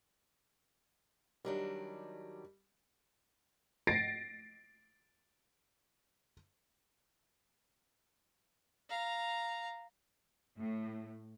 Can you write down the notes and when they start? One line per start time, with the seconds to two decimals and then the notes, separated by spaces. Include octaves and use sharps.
1.45 D#3 F#3 G3 D4
3.87 A6 A#6 C7 D7
8.90 F5 A#5
10.57 A2